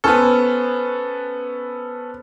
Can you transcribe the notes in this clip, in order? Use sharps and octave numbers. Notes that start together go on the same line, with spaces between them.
B3 C#4 A4 B4 C5